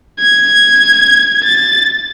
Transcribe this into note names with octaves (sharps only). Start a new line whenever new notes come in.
G#6
A6